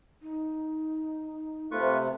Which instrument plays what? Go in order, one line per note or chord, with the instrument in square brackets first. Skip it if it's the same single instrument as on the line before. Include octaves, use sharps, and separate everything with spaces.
[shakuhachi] D#4
[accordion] C3 [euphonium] A3 [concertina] F4 B4 C#6 [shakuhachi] C5